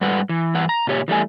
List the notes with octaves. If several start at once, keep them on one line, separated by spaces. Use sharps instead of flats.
G#2 G3 B4 F#5
E3
G2 E3 F#5
A#5
A#2 C#3 G4 C#5
E3 G3 A3 G#5